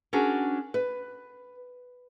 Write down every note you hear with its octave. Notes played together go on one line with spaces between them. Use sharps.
C#4 D4 F#4 G#4 A#4
B4